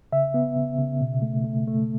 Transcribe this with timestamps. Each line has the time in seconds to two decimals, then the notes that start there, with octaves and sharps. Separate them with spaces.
0.12 C#3 E5
0.34 B3
0.56 C#3
0.78 C#3
1.01 B2
1.22 A3
1.44 A3
1.67 A3